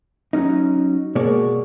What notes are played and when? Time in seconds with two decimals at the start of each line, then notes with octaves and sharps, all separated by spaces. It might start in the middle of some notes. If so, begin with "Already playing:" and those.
0.33 F#3 C#4 D#4
1.15 B2 G#3 A#3 C#5 D5